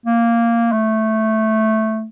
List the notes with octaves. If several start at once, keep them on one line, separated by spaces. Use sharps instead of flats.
A#3
A3